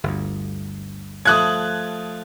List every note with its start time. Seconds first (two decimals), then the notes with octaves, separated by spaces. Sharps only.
0.04 G1 D2
1.26 F3 A3 D#6 F#6 G#6